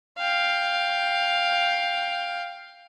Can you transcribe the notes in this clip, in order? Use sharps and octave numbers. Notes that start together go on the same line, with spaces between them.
F5 G5